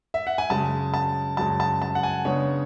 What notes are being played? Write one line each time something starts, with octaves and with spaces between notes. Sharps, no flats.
E5
F#5
G#5
F#2 C#3 G#3 A5
A5
F#2 C#3 G#3 A5
A5
A5
F#5
G#5
C#3 G#3 B3 D4 C#5